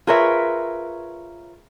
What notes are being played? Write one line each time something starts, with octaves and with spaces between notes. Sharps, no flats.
F4 G#4 A#4 B4 C#5 E5